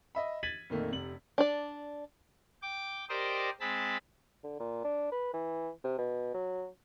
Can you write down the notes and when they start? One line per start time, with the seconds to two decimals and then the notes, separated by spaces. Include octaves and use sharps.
0.15 D#5 E5 B5
0.43 G#6 A6 B6 D#7 F#7
0.70 F2 A#2 D#3 A3
0.92 F1 C3 F#7
1.38 D4 D5
2.62 G5 D6
3.09 G4 A#4 C5 D5 D#5
3.60 G#3 C4 A5 B5
4.44 D3
4.59 A#2
4.84 D4
5.12 B4
5.33 E3
5.84 C3
5.98 B2
6.34 F#3